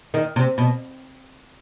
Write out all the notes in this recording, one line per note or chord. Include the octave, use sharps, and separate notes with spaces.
D#3
C3
B2